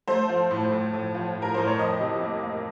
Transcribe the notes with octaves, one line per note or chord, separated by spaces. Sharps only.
A3 C5
F3
A2
A2
A2
F3
A2
A#4
A2 C5
C#5
F2 D#5
C3
A#3
A#3